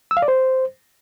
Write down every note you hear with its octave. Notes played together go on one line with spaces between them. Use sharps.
E6
F5
D5
C5